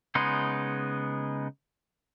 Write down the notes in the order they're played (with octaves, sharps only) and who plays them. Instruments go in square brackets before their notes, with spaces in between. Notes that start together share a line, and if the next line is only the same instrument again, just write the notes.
[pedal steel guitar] C#3 G#3 B3 D#4 C6